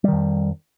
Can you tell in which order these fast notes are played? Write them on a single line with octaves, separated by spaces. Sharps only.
G3 D#3 F2